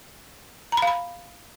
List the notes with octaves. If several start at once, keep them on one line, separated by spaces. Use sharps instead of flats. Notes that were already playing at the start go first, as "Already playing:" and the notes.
A#5
B5
F5
B5